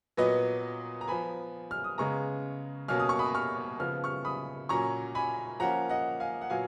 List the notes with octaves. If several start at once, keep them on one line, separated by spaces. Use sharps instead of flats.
A#2 F#3 B3 B4 D#5
A#5
F3 B3 G#5 B5
F6
D#6
C#3 G#3 B3 A#5 C#6
B2 F#3 A#3 C#4 F6
D#6
C#6
B5 D#6
C#6 F6
C#3 F3 B3 F6
C#6 F6
B5 D#6
A#2 F#3 C#4 A#5 C#6
G#5 B5
F3 A#3 C#4 F#5 A#5
D#5 F#5
F5 G#5
F#5
A#2 F#3 B3 F5 G#5